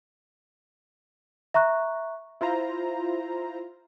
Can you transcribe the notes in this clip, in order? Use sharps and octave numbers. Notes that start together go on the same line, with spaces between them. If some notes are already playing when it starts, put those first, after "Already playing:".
E5 A#5 C#6 F#6
E4 F4 C5 A#5